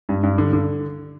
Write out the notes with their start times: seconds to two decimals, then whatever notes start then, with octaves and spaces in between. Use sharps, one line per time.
0.09 G2
0.23 G2
0.38 D3
0.53 D3